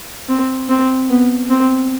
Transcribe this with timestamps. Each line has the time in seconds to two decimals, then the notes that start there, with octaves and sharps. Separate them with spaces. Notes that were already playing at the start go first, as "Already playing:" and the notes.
0.29 C4
0.69 C4
1.09 B3
1.50 C4